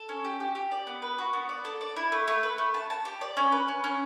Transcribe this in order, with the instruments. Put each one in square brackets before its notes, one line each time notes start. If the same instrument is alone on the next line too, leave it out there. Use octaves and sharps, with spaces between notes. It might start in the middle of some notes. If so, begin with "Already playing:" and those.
Already playing: [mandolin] A4
C#4
G4
G4
G4
D5
B3
B4
F#4
B3
D5
A4
D5
E4
A3
A3
B4
A3
A5
A5
G4
D5
C#4
B4
C#4
C#4